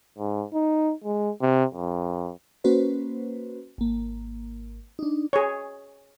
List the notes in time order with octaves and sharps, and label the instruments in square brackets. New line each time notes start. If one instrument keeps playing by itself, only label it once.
[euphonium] G#2
D#4
G#3
C3
F2
[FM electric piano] A#3 C#4 F#4 B4 C5
G#1 A#3
D4 D#4
[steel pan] G#4 C#5